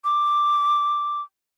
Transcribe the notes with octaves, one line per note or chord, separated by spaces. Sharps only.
D6